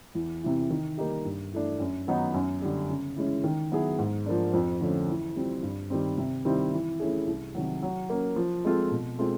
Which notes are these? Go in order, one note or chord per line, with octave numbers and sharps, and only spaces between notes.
E2
C3 E3
D#3
G3 A#3 D#4 G4
G2
E3 A3 D4
F#2
D#3 F#3 B3 D#4
F#2
D3 G3
C#3
E3 G#3 C#4 E4
D#3
F#3 B3 E4 G#4
G#2
F3 A#3 D4
F2
D3 F3 A3 C#4
E3
G3 C4 F4
G2
D#3 G3 C4
C3
D#3 G3 C4 E4
E3
A3 C#4 E4 G#4
C2
C3 D#3 F#3
F#3
A#3 C#4
F3
G#3 C4 F4 A4
B2
G#3 C4 F4 A4